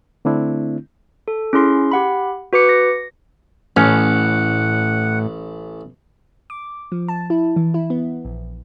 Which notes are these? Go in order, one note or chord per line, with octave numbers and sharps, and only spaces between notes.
D3 A3 C4 D4 E4
A4
C#4 E4 G#4 C6
G4 F#5 B5
F#4 B4 D6 C#7
A#6
A1 A2 C#4 F#5
D6
F3
A5
E4
E3
E4
B3
A#1